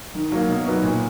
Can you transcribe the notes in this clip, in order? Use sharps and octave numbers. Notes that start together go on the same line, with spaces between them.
D#3
F#3 A#3
B2
F#3 B3 D#4
A#2